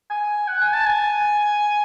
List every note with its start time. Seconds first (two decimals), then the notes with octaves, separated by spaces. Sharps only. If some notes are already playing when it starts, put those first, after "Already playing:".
0.10 G#5
0.48 F#5
0.61 G#5
0.73 A5
0.86 G#5